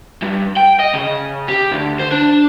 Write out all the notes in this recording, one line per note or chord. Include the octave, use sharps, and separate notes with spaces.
G2
G5
D#5
C#3
G4
D2
C5
D4